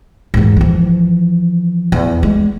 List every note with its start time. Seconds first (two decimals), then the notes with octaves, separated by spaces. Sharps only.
0.34 E2 G#2
0.56 E3 F3
1.92 E2
2.23 G#3